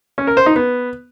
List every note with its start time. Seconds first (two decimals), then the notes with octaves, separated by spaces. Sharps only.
0.18 C#4
0.27 A#4
0.37 C5
0.46 D#4
0.56 B3